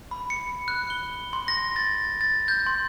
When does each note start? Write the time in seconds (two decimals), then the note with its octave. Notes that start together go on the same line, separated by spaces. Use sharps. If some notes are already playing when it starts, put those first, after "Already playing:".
0.11 B5
0.30 C#7
0.68 F#6
0.90 G7
1.33 C6
1.48 A#6
1.76 A6
2.21 A6
2.48 G6
2.66 C6